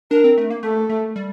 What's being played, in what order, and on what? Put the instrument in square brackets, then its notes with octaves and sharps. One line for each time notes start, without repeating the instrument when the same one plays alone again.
[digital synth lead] D4 [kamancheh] A#4
[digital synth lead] C4
A3
A#3
[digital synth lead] A3 [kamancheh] A4
[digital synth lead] A3
G3